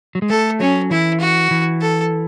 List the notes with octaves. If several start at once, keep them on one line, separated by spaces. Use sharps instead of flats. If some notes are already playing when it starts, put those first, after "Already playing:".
F#3
G#3
A3 A4
F#3 C#4
E3 E4
F#4
E3
A4